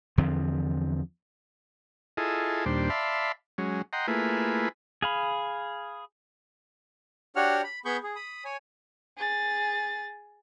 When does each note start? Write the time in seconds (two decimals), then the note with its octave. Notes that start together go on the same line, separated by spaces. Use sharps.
0.18 E2 D3 F3 C4
2.17 E4 F4 G#4 A4 D#5
2.66 D#2 A#2 G3 D4 C5
2.90 D5 E5 F5 A5 B5 C6
3.58 F#3 G#3 C#4
3.93 D#5 F#5 G5 A#5 C6
4.08 A3 A#3 E4 F4 G#4 B4
5.02 G#4 F5 B5
7.36 D4 F#4 G4 C#5 F#5 F6
7.64 B5
7.85 B3 G#4 B5 C#6 G6
8.03 G#4
8.15 B5 D#6
8.45 C#5 G#5
9.17 G#4 A6